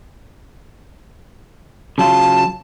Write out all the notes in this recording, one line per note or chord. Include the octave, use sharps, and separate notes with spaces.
C#3 F#3 F4 A5